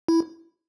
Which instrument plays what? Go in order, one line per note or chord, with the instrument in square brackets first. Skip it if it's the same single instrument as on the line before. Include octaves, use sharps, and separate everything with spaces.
[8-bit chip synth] E4